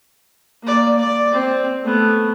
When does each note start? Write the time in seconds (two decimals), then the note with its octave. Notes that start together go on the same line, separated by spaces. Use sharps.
0.62 A#3 D5
0.98 D5
1.32 C4
1.84 A3 B3